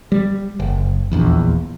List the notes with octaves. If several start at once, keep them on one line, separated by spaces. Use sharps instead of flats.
G3
F#1
D#1 A#1 E2